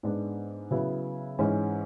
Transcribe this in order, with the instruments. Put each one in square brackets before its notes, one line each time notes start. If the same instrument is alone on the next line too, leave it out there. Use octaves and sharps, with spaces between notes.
[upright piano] G#2 G#3 B3 D4
C#3 F#3 B3 E4
G#2 E3 G#3 C#4